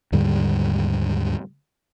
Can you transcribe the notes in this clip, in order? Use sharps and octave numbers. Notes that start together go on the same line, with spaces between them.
D#2 G#2 D3 G3